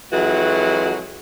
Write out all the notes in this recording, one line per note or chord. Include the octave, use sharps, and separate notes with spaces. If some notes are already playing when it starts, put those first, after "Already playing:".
F2 E3 F#3 G#3 F#4